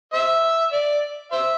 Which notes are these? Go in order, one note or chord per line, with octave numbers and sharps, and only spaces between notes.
C5 E5
D5
C5 E5